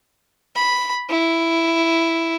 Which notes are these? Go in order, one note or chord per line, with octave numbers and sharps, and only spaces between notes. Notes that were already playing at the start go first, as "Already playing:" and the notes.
B5
E4